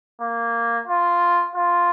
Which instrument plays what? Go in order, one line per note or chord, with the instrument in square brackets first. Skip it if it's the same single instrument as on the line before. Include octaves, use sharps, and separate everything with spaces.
[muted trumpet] A#3
F4
F4